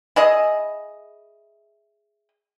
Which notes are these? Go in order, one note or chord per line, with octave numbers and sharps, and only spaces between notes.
E4 G#4 D#5